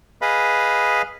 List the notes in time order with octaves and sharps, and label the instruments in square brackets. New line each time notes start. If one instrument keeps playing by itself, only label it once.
[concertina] G#4 B4 D#5 F5 B5